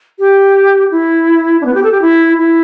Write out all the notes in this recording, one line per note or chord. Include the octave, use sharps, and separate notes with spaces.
G4
E4
D4
B3
G4
A4
G4
E4
E4